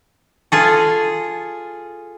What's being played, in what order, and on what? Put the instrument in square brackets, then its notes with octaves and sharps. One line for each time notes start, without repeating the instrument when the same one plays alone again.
[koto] F4 G#4 A4